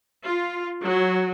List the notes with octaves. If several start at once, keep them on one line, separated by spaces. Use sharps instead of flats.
F4
F#3